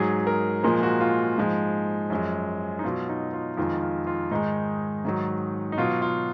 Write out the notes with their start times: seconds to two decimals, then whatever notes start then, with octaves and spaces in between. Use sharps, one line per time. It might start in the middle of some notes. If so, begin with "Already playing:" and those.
Already playing: G#2 F#3 G#4
0.27 A#4
0.63 A#2 F3 G#3 A#4
0.83 F#4
1.01 F4
1.38 G#2 F3 G#3
2.10 F#2 F3 G#3
2.79 D#4
2.84 B2 F#3 F4
3.09 D#4
3.33 F4
3.57 F2 D#3 G#3 F4
3.82 F4
4.07 F4
4.31 G#2 D#3 G#3 D#4
5.05 G#2 D#3 F#3
5.72 D#4
5.78 B2 F#3 F4
6.02 F4